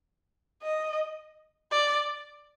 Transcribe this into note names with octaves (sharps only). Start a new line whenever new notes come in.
D#5
D5